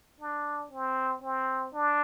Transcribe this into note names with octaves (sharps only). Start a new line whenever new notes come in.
D4
C4
C4
D4